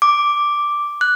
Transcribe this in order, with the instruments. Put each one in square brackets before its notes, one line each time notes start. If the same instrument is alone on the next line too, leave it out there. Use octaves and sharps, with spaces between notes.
[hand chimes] D6
F#6